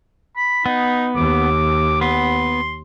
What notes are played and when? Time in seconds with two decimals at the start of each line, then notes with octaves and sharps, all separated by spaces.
0.36 B5
0.66 B3 D#4
1.16 D#2 D6
2.01 B3 C6